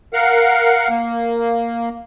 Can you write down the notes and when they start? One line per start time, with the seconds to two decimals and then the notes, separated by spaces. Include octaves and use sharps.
0.13 A#4 F5 F#5
0.89 A#3